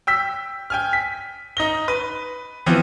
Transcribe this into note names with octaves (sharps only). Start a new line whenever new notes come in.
G5 E6 B6
G5 G#5 F6
B6
D#4 A#6 G7
B4
E3 F3 B3 C4